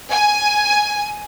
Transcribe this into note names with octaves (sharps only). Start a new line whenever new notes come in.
G#5